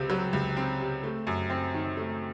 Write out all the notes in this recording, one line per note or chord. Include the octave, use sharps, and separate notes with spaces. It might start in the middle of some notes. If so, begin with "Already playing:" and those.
Already playing: C#2 C3 C4
F#3
C#2
C4
C3
A3
F#2
C4
D#3
A3